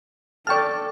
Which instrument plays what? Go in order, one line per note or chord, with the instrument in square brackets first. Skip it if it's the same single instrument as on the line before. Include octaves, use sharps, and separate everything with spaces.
[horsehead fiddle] A4 [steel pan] D5 G5 A5 [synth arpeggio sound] C#6 F6